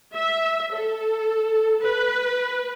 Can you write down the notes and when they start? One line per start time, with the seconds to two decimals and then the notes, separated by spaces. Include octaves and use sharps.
0.13 E5
0.74 A4
1.82 B4